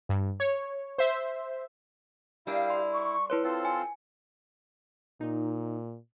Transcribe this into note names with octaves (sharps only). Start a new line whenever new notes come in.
G2
C#5
C5 E5
G3 D4 E4 G4 A#4 F5
C6
C#6
E4 B4 C#5 C6
C4 F4 A4
G#5
A#2 D#4